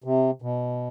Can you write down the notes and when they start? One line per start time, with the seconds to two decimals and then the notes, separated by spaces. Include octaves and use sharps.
0.04 C3
0.42 B2